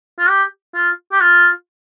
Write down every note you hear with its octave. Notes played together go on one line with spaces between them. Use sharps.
F4
G4
F4
G4
F4